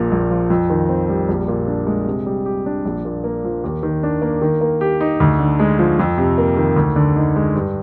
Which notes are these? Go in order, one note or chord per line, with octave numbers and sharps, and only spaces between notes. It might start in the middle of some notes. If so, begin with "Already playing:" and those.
Already playing: A#1 A#2
A#1
F3
F2
D#3
C4
G3
A#1
A#2
D4
G#3
C3
G3
G4
D4
A#1
A#2
A#3
F3
D#2
D#3
D4
A#3
D#3
A#3
G4
D#4
D2
D3
G#3
F3
F2
C3
A#3
D#3
D2
D3
D#4
G#3
G2